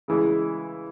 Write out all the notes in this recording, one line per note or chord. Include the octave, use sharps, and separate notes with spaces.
C#3 E3 G#3